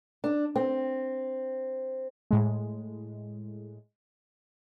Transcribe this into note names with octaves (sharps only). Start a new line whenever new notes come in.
D4
C4
A2 G#3